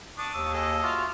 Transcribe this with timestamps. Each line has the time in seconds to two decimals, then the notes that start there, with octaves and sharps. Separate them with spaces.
0.18 D4 A5 C#6 D#6
0.34 D#2 E6
0.54 G#4 A4 D#5 E6
0.83 F4 F#4 E5 D6 F6